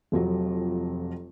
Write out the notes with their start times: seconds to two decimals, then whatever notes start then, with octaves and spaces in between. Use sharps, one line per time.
0.12 F1 F2 F#3